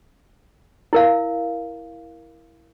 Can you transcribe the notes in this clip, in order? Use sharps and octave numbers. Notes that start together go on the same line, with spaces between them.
E4 A#4 F5